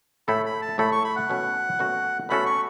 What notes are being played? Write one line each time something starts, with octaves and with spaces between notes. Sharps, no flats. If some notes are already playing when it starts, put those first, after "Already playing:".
A2 A3 E4 A4 B5
B5
A5
A2 A3 E4 A4 B5
C#6
B5
F#5
B2 A3 C#4 F#4 A4
B2 A3 C#4 F#4 A4
B2 A3 C#4 F#4 A4 B5
C#6